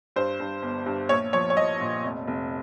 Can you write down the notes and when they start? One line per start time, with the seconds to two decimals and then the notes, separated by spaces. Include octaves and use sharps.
0.16 G2 C5
0.40 G2
0.63 G1
0.86 G2
1.09 A#1 C#5
1.33 F3 C#5
1.50 C#5
1.57 F3 D#5
1.81 A#2
2.04 F1
2.27 F1